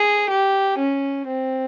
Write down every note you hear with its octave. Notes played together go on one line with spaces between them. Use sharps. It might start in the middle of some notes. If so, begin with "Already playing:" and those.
Already playing: G#4
G4
C#4
C4